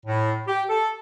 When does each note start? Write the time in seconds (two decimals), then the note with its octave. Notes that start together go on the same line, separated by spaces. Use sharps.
0.06 A2
0.47 G4
0.69 A4